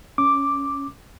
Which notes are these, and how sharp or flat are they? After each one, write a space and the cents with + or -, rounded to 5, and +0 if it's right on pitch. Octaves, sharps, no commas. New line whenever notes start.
C#4 +5 D6 +0